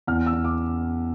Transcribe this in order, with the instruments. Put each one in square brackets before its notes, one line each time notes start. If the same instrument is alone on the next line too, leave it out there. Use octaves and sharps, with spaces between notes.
[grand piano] E2 F6
E6
E2
D6